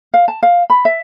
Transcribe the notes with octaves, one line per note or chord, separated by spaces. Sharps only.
F5
A5
F5
B5
E5